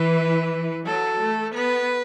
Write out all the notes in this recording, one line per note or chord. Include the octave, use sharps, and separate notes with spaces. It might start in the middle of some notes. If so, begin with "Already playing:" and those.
Already playing: E3 B4
F#3 A4
A3
B3 B4